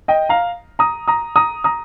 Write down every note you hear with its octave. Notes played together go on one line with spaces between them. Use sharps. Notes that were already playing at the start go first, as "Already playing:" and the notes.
D#5 G5
F5 A#5
A#5 D#6
A#5 D#6
A#5 D#6
A#5 D#6